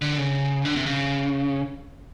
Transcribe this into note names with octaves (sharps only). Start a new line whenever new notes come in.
D3
C#3
D3
C3
C#3